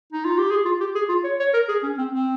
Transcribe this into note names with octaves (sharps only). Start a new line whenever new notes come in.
D#4
F4
G4
G#4
F4
G4
G#4
F4
C#5
C#5
A#4
G#4
C#4
C4
C4